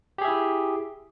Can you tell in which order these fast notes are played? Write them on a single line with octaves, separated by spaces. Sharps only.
G4 G#4 E5 E4